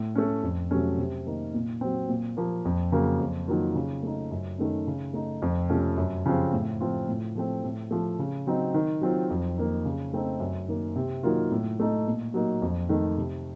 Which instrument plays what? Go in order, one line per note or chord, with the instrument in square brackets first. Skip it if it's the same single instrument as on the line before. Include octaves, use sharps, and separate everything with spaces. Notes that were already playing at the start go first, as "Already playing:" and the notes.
Already playing: [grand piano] A2
A3 C#4
F2
C3 F#3 A3 C#4
C3
D#3 A#3 D#4
A#2
F#3 C4
A#2
F3 A#3
F2
C#3 F#3 A#3
F2
D#3 F#3 A#3 F4
C#3
A3 D#4
F#2
D#3 A3 C#4
C#3
A3 D#4
F2
C3 F3 A3 C#4
F#2
C#3 F3 C4
A2
F3 C4 F4
A2
F3 A3 C4
A2
F3 A3
C#3
F#3 C4 D#4
D#3
F#3 C4 F4
F2
D#3 A#3 D#4
C#3
A3 C4 D#4
F#2
D#3 A#3
C3
D#3 F#3 A#3 F4
A2
A3 D#4
A#2
F#3 A#3 D#4
F2
D#3 A3 D#4
C3